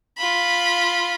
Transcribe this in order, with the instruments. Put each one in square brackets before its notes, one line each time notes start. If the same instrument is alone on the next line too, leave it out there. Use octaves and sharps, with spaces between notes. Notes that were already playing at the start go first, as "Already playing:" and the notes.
[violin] F4 B5